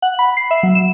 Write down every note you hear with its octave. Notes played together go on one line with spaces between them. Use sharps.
F#5
B5
C7
E5
F#3
E7